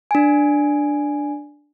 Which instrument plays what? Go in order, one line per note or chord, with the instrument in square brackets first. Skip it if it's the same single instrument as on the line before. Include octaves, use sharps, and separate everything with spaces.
[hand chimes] D4 G#5